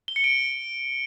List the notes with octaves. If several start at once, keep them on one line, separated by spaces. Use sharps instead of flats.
G7
C#7
D7